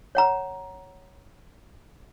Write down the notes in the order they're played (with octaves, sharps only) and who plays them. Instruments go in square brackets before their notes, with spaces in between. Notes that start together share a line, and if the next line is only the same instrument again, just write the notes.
[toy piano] C#5 F#5 A#5